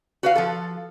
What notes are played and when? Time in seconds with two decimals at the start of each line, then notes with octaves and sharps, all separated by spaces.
0.23 F#4 B4 F5
0.36 F3 A4